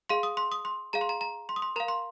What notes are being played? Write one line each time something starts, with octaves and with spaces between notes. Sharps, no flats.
G#4 F5 C6
D#6
C6
D#6
C6
G#4 F5 A#5
C6
A#5
A#5
C6
D#6
C6
A#4 F5 A#5
C6